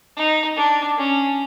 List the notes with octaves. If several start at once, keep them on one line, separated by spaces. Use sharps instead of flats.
D#4
D4
C#4